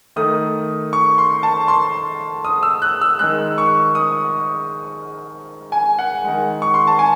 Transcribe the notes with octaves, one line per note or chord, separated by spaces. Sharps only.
D#3 A3 D#6
C#6
C6
A5
C6
D#6
E6
F#6
E6
D#3 G#3 F#6
C#6
D#6
G#5
F#5
D#3 G#3
C#6
C6
A5
G#5